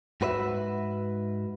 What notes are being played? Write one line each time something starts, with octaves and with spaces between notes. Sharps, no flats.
G#2 F#4 B4 C5 E5